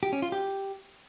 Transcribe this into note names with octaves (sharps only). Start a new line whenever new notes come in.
G4
C#4
F4
G4